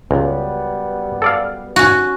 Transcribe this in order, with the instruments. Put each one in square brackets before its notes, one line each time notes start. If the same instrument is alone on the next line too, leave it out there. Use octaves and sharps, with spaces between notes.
[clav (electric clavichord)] C#2 [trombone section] F#2 G3 B3
[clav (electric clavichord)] A4 D5 F5
[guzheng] C#4 F#4